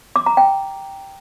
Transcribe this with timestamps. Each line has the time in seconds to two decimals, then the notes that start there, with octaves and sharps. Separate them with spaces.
0.16 D6
0.26 A#5
0.37 G5